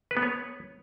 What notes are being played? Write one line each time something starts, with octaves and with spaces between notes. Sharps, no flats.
B4
B3
C#5